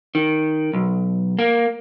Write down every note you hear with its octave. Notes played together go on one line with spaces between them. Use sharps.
D#3
B1
A#3